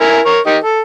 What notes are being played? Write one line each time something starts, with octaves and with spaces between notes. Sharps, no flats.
E4 A#4 G#5
A#4 C#5
D#3 G4 D#5
A4